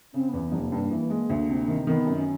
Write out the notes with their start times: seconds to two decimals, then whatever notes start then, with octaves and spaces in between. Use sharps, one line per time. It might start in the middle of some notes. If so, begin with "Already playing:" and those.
0.14 C#3 C4
0.29 E2 B3
0.43 B3
0.52 F1
0.58 A#3
0.72 G2
0.91 E3
1.10 G#3
1.30 D2
1.49 C3
1.68 D#3
1.87 D#3 B3
2.06 F#2
2.16 C#4